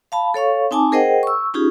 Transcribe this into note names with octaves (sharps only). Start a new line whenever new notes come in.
F5 A5 B5
A4 C#5 F5 C#6
C4 D#4 G#5 A5 D6
G#4 A#4 C5 D#5 F#5 G5
C#6 E6
C#4 D#4 F4 G4 G#4